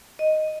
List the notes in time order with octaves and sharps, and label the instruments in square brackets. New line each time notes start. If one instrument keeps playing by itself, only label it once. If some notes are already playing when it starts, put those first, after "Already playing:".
[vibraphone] D#5